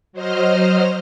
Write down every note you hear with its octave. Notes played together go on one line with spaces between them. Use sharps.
F#3 C5 D#5 F6